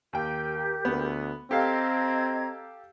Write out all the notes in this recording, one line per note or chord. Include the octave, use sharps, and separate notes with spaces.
D#2 G4 A#4 G5
D2 B3
C4 G4 A4 D#5 F5 A#5 G#6